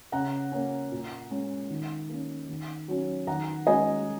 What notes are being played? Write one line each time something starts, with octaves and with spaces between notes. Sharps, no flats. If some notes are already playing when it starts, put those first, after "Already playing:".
C#3 F#5 A#5
A#3 C#4
A#2
G#3 C#4
D#3
A#3 C#4
D#3
F#3 C#4
D#3 F#5 A#5
G#3 C#4 D#5 G#5